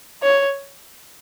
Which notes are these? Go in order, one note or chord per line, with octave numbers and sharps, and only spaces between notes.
C#5